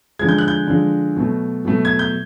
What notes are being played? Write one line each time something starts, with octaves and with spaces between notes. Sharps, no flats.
D3 F3 G#3 G#6
G6
F#6
G6
D3 F3 G#3
B2 F#3 A3
B2 F#3 A3
G#6
G6